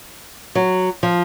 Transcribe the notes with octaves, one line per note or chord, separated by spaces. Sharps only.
F#3
F3